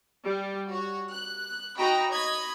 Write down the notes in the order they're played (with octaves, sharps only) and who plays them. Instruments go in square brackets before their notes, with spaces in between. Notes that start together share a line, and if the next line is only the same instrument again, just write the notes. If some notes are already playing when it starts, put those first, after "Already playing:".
[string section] G3
F#4 C#5
F#6
D#4 F#4 D#5 G5 A#5 B5
C#5 D#5 B5 G#6